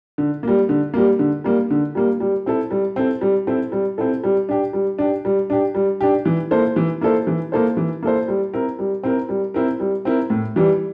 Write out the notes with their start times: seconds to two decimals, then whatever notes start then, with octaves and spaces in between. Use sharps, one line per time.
0.18 D3
0.43 G3 A#3
0.69 D3
0.94 G3 A#3
1.19 D3
1.44 G3 A#3
1.70 D3
1.95 G3 A#3
2.20 G3
2.46 C4 E4 A4
2.71 G3
2.96 C4 E4 A4
3.21 G3
3.47 C4 E4 A4
3.72 G3
3.98 C4 E4 A4
4.24 G3
4.49 D4 G4
4.73 G3
4.99 D4 G4
5.25 G3
5.50 D4 G4
5.75 G3
6.01 D4 G4
6.25 E3
6.51 A#3 E4 A4 C5
6.76 E3
7.01 A#3 E4 A4 C5
7.27 E3
7.52 A#3 E4 A4 C5
7.77 E3
8.03 A#3 E4 A4 C5
8.28 G3
8.53 C4 E4 A#4
8.79 G3
9.03 C4 E4 A#4
9.29 G3
9.54 C4 E4 A#4
9.80 G3
10.05 C4 E4 A#4
10.30 A2
10.56 E3 G3